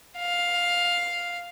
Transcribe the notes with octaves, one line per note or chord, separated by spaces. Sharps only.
F5